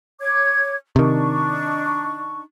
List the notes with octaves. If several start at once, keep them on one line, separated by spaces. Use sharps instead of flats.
C#5 D6 G#6
C3 D#3 D4 D#4 C#6